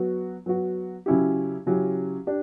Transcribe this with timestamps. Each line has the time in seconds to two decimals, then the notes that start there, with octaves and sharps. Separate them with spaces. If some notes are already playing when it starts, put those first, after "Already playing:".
Already playing: F#3 B3 F#4
0.46 F#3 B3 F#4
1.06 C#3 F#3 C#4 E4 G4
1.66 C#3 F#3 C#4 E4 G4
2.27 D4 G4